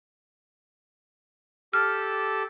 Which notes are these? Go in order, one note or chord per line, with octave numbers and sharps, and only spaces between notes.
G4 A4 E6 F6